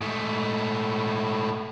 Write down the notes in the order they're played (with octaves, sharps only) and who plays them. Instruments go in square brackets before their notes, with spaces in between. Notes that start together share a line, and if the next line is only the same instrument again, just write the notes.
[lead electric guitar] G#2 A3